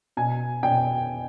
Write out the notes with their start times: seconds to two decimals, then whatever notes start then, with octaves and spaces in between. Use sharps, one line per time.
0.17 B2 G#5
0.63 B2 G5